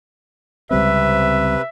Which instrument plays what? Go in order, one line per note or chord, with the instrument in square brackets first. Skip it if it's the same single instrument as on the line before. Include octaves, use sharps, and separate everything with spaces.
[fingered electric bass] C#2 G3 C4 [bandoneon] C3 B4 [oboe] E5